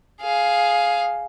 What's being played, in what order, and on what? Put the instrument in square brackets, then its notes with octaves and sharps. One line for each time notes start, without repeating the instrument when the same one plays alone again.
[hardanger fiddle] G#4 F5